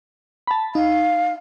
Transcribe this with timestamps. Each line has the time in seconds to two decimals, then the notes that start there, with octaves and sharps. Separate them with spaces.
0.47 A5 B5
0.75 D#4 F5